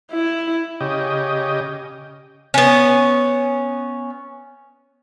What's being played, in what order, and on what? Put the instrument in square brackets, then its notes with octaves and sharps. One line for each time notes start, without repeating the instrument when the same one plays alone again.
[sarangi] E4
[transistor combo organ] C#3 G4 D#5
[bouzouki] B3 C#4